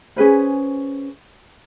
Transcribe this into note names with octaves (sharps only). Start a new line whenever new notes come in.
C#4 G#4 B4 C5